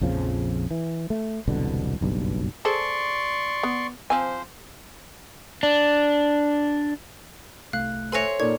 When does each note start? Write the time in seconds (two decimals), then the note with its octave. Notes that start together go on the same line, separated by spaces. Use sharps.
0.01 A#1 F2 C#3 F3
0.71 E3
1.10 A3
1.48 E1 C2 B2 D3
2.01 F#1 B1 G2
2.65 G#4 A4 C5 D5 C6 C#6
3.63 B3
4.10 F3 C4 C5 G#5
5.63 D4
7.73 C2 A3 F5 F#6
8.12 A4 C5 C#5 E5 G#5 C6 A#6
8.40 A#2 D#4 A4 A#4 D5 C#6 G#6